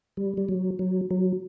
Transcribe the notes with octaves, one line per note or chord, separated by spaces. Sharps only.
G3
G3
F#3
F#3
F#3